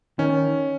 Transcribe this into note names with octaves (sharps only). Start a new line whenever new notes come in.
D#3 C#4